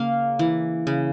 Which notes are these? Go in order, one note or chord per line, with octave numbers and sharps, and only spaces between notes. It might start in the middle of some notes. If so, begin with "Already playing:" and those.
Already playing: C#3 A#3 F5
E3
C#3